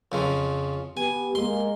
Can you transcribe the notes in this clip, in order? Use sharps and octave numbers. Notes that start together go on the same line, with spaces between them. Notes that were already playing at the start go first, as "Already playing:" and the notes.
F2 C#3 F3
B3 G4 G#5
G#3 A#3 C6